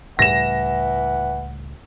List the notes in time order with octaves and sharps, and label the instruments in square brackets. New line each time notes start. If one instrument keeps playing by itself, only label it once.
[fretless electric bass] C#2 A2 G3 [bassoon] E3 [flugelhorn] F#5 [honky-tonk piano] A#6 E7